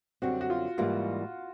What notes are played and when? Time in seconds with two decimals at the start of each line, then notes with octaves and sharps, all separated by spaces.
0.22 F#2 D3 G3 C4 F#4
0.41 F#4
0.50 F4
0.78 G#2 E3 G3 A#3 F4